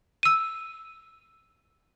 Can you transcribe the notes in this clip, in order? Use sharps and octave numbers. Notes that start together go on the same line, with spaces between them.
E6 D#7